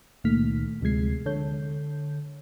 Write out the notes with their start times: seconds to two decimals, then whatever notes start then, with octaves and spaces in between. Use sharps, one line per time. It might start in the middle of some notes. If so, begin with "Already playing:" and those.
0.24 C#2 A#2 D#3 A3 F6 B6
0.82 D2 C3 F3 G#3 G#6 C7
1.26 D3 A4 C#5 G6